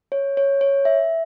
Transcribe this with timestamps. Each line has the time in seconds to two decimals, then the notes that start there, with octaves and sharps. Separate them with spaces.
0.12 C#5
0.37 C#5
0.61 C#5
0.85 E5